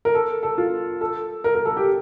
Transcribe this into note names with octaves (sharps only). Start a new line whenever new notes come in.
A#4
A4
A4
F4
A4
A#4
A#4
A4
G4